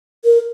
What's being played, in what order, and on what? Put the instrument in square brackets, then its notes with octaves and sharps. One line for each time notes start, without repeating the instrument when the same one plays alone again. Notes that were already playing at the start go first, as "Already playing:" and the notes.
[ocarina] A#4